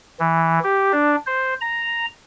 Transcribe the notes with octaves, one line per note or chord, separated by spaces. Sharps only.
E3
G4
D4
C5
A#5